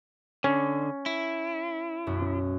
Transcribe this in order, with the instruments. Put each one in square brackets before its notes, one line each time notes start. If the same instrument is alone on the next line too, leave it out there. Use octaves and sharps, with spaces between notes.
[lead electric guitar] D3 [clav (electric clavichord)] C#4
[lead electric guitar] E4
[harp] B1 F#2 F#4